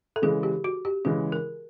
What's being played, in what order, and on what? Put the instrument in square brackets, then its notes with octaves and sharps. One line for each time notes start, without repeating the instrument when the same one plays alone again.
[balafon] A4
[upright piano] C#3 E3 G#3 [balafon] G#4
[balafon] G4
F#4
G4
[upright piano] C#3 E3 G#3 [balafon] G#4
[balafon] A#4